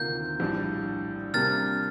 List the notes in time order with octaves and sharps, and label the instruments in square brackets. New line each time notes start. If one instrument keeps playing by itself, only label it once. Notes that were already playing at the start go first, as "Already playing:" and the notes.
Already playing: [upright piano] D2 C3 D#3 A#3 F4 [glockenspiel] G6
[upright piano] A#1 A2 G3 D4
[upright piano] C3 G3 A#3 D4 [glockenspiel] F6 A6